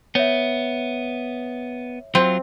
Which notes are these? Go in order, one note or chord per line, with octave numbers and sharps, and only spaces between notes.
B3 C#5 E5
F#3 C4 F4